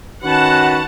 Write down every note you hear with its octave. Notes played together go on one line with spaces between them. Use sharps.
D#3 C#4 F#4 B4 F#5 A5